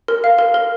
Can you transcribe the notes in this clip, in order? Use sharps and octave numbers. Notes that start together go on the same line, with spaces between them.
A#4
F5
A#4
A#4